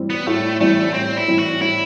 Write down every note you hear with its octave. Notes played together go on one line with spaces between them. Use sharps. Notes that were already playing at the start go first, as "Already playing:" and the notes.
Already playing: A2 E3 G3 C4
B3
A2 A3
E3 G3 A3 C4
A2 C4
E4
E3 G3 C4
F#4
A2 E4